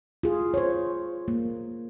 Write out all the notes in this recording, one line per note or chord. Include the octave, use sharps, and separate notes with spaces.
F4 G#4
C5 C#5
A#3